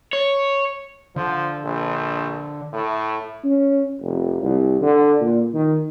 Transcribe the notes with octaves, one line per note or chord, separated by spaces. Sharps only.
C#5
D3 F3
A#1
A2
C#4
F1
C2
D3
A#2
D#3